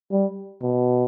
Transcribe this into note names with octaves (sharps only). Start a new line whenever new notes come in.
G3
B2